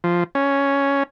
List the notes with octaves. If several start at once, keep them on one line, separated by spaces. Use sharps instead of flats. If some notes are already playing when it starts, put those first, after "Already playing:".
F3
C#4